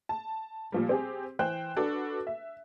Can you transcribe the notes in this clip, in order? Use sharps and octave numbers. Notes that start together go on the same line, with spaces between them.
A5
A#2 F3 G3
C4 G4 G#4
E3 C5 G5 F#6
D4 F#4 A4 B4
E5